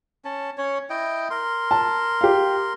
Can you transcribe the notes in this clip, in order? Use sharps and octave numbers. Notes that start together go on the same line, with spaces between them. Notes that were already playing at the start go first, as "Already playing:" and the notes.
C#4 A5
C#4 C#5
E4 D#5 G5
A#4 C6
A5
G4 F5